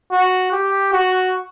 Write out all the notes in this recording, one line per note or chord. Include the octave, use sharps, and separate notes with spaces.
F#4
G4
F#4